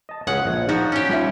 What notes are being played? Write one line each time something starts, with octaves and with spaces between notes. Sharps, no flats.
D#5 A5
C#2 C#4 G#4 F#5
A#1
F3 D4 D#4 F#4
C#4 G4
G3 F4 E5